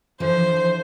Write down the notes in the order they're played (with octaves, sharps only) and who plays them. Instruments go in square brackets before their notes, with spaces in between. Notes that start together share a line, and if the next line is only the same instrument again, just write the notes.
[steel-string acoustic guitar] D3 E3 F3 [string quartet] C5